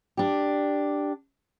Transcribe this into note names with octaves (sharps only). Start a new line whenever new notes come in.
D4 G4